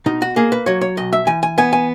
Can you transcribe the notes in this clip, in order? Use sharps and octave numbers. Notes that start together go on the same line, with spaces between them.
B2 D#4
F#4
A#3 G#4
B4
F#3 C#5
C#5
B1 D#5
E5
E3 G#5
G#5
B3 G#5
G#5